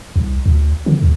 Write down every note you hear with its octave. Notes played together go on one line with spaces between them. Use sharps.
C2
D2
D3
D2